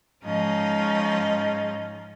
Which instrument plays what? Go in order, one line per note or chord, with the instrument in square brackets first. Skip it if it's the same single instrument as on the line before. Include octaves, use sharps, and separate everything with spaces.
[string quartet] G#2 F3 C#4 D#4 D#5